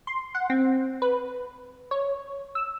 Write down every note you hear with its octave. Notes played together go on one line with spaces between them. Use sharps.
C6
F#5
C4
B4
C#5
E6